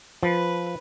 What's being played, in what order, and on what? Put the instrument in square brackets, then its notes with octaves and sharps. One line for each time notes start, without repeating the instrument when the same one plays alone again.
[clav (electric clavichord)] F3 [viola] B4